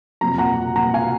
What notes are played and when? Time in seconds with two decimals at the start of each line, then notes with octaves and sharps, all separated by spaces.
0.21 F2 C3 F#3 A#5
0.38 F#5 A#5
0.76 F#5 A#5
0.94 F5 G#5